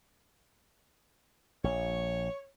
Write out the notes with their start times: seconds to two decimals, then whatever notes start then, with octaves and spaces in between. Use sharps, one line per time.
1.64 A#1 C#5